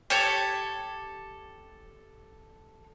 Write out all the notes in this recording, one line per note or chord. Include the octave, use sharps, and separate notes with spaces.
G4 A4 C#5